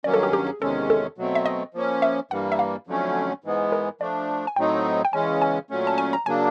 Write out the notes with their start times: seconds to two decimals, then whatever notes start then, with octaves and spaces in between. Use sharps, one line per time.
0.04 G2 D#3 F#3 A#3 C#4 D5
0.14 A4
0.23 G4
0.33 G4
0.47 G#4
0.61 E2 C3 D#3 G#3 C#4 A4
0.90 A4
1.18 B2 F#3 A3 C4
1.35 E5
1.46 D#5
1.74 F3 A#3 C#4
2.02 E5
2.31 G2 E3 G3 A#3 F#5
2.52 E5
2.59 F5
2.87 F2 D3 F#3 A3 C#4
3.44 G#2 E3 G#3 B3
3.72 A#4
4.01 F3 A3 D4 D5
4.47 G#5
4.56 A2 F#3 A3 C4 D#4 G5
5.05 G5
5.13 E2 C#3 E3 G#3 C#4 G#5
5.42 G#5
5.70 A#2 F#3 A3 C#4
5.87 A5
5.98 G#5
6.13 A#5
6.26 C#3 F#3 A#3 D4 G#5